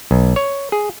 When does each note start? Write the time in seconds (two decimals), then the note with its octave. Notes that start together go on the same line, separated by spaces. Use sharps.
0.11 B1
0.36 C#5
0.72 G#4